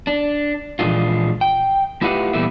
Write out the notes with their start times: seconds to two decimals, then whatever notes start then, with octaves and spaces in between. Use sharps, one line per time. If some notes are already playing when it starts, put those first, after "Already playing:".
0.07 D4
0.79 A#2 E3 F3 G#3 D4 F4
1.41 G5
2.01 A3 E4 F4 G4 B4 F#5
2.33 A#2 E3 G3 A3 B3 E4